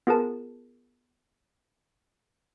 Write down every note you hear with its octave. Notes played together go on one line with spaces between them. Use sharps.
B3 F4 G#4 A#4 B4 A5